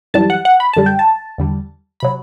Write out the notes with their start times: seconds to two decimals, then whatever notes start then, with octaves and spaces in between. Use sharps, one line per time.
0.14 F#2 E3 G3 A5
0.30 F#5
0.45 F#5
0.60 B5
0.73 F#2 D3 G3 A5
0.86 G5
0.99 A5
1.38 E2 D3 G3
2.00 C3 F#3 B5